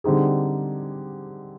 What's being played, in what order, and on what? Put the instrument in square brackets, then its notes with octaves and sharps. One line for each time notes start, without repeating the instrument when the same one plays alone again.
[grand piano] D3 G3 C4 D#4 G#4